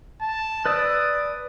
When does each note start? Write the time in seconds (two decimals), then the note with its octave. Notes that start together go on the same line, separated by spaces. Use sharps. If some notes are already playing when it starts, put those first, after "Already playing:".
0.22 A5
0.65 B4 D5 D#6 E6